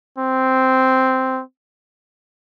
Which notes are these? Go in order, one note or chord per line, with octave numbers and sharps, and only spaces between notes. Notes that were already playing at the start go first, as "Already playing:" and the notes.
C4